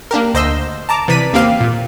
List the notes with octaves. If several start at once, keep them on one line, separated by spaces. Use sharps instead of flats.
A#3 D4 G4 A#4
D2 C5 D#5 C6 E6
A5 A#5 D6
C3 E3 D5 B6 D#7
D#2 A#3 C4 G4 F5
A#2